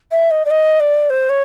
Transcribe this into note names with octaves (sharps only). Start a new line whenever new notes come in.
E5
D#5
D5
D#5
D5
C5
C#5